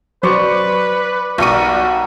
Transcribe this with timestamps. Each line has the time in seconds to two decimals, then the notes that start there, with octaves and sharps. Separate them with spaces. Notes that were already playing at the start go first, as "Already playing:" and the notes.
0.23 F#3 B4 C5 D5 C#6
1.38 B1 D#3 G3 F#4 C#6 D#7